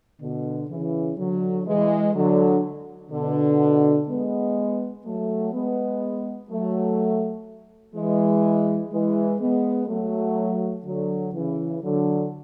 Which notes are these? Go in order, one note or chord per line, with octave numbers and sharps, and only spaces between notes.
B2 D3
C#3 E3
D3 F#3
E3 G#3
D3 F#3
B2 D3
G#3 B3
F#3 A3
G#3 B3
F#3 A3
E3 G#3
E3 G#3
G#3 B3
F#3 A3
D3 F#3
C#3 E3
D3 F#3